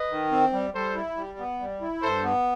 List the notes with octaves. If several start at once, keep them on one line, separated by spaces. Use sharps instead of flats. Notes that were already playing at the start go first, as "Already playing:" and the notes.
Already playing: B4 D#5
D#3
C4
G3
G3 A4 C5
E4
G3
B3
G3
E4
G2 A4 C5
B3